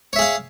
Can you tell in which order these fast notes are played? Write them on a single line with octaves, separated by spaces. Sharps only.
C#5 E5 G#4 F5